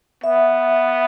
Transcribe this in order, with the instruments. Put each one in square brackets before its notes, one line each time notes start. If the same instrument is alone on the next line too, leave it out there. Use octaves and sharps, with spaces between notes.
[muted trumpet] B3 [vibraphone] E5